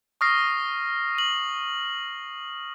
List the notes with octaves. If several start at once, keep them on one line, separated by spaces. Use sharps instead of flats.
C#6 D#6 F6 A#6 C7
D#7 F#7